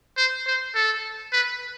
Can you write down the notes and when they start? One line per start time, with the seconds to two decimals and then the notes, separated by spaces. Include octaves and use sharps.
0.17 C5
0.47 C5
0.75 A4
1.32 B4